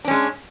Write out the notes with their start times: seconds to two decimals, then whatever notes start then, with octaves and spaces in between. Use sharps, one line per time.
0.05 D4
0.08 C#4
0.11 G#3